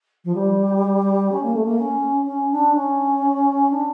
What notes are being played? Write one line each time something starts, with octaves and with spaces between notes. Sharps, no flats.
F3
G3
C#4
A#3
A3
A#3
C#4
C#4
D4
C#4
D4